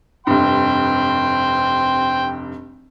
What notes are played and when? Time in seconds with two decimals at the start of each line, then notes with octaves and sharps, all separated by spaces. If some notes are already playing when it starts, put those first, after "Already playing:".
0.27 F1 G2 G5 C6